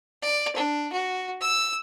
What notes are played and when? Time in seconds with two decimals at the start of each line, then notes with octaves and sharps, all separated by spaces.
0.23 D5
0.56 D4
0.93 F#4
1.41 E6